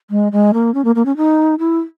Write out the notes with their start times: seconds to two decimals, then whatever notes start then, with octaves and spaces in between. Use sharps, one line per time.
0.10 G#3
0.32 G#3
0.54 A#3
0.74 C#4
0.85 A#3
0.95 A#3
1.05 C#4
1.17 D#4
1.59 E4